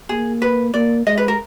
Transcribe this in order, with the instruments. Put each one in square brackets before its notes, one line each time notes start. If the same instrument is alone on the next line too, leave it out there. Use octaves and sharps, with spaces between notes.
[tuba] A#3 [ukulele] G#4
[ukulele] B4
[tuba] A#3 [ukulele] D5
[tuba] G#3 [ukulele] D#5
[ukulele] B4
A#4